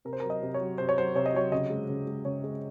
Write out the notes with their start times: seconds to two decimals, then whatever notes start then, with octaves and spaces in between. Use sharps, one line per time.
0.05 C3 A#4
0.13 C5
0.20 A#4
0.23 F#3
0.30 D#5
0.42 C3
0.54 C#5
0.61 F#3
0.78 C3 C5
0.89 C#5
0.98 F#3 C5
1.15 C3 C#5
1.26 D#5
1.34 F#3 C#5
1.52 C#3 D#5
1.70 G#3
1.89 C#3
2.07 G#3
2.25 C#3 C#5
2.44 G#3